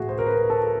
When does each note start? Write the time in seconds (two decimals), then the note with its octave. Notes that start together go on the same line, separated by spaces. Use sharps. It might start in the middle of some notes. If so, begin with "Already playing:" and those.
Already playing: A2 E3 A3 F#4 G#4
0.09 C5
0.19 A#4
0.27 B4
0.50 A4